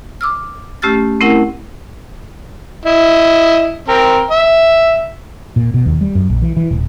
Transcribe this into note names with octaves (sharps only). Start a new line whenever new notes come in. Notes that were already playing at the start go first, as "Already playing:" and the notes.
D6 E6 F6
A3 C#4 G4 E6 F6 A6
A3 C4 C#4 E4 A#4 F#5
E4 D#5
C4 A#4
E5
A#2
B2
D#2
G3
F#2
A#1
E3
E3
D#1